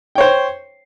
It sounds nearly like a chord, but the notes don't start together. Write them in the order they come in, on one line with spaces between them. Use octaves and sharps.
G5 C#5 C5